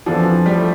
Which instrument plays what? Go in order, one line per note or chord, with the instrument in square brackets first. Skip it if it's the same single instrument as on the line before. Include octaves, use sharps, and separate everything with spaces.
[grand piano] F2 E3 B3 D4 A4 [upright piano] F3
[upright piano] G3
A3